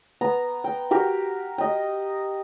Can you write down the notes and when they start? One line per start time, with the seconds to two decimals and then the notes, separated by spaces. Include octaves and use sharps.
0.21 B3 A#5
0.64 G5
0.91 F#4 G4 A#4
1.58 D#5 G5